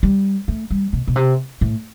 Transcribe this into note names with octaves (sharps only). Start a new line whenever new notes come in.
G3
A3
G3
B2
B2
C3
A2